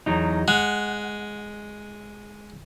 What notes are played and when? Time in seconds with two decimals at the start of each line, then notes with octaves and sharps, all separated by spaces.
0.06 E2 F#3 D#4
0.48 G#3 F#5